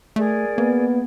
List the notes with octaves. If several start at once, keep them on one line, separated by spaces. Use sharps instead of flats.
A3 G#4 A#4 D5
A#3 B3